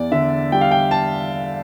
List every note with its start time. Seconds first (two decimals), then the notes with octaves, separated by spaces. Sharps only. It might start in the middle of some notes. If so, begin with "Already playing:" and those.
Already playing: E2 D5
0.11 D3 E5
0.52 G3 G5
0.61 F5
0.71 G5
0.91 A5